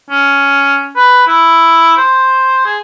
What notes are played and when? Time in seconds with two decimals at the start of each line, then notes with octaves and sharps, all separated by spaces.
0.10 C#4
0.96 B4
1.27 E4
1.97 C5
2.66 G#4